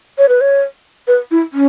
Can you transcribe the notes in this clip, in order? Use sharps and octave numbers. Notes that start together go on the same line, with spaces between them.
C#5
B4
C#5
B4
E4
C#4